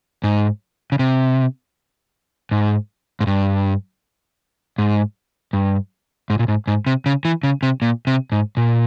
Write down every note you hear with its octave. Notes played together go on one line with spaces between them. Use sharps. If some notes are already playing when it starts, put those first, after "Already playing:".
G#2
C#3
C3
G#2
G#2
G2
G#2
G2
G#2
A#2
G#2
G#2
C3
C#3
E3
C#3
C3
A#2
C3
G#2
A#2